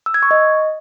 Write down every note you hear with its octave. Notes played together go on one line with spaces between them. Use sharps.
E6
G#6
C#6
D#5